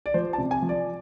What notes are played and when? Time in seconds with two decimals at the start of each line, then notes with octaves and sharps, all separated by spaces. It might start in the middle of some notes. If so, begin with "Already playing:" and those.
0.06 D5
0.14 F3 C5
0.33 A5
0.38 C3
0.51 G#5
0.62 F3
0.69 D5